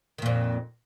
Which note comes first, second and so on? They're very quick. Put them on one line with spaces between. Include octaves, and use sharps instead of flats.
D#3 A#2 F2